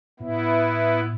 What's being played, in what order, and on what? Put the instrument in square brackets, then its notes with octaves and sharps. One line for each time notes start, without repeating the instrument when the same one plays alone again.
[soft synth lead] A2 [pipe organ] B3 E4